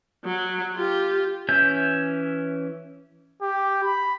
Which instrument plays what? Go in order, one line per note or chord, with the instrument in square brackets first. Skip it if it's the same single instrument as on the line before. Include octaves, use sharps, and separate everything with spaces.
[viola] F#3
F4 G4
[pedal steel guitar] E3 C#4 E5 G6
[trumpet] G4
B5